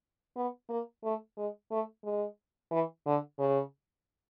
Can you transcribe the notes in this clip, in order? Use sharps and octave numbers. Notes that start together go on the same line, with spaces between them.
B3
A#3
A3
G#3
A3
G#3
E3
D3
C#3